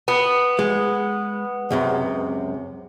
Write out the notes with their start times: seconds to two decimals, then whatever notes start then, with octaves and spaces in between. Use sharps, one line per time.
0.08 B3
0.59 G#3
1.70 C#2 F#2 C3